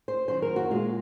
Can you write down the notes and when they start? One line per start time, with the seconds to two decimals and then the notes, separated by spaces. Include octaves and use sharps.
0.08 C5
0.28 F#2 D#3 F#3 C5
0.42 A#4
0.56 F#4
0.71 A#2 G#3 F4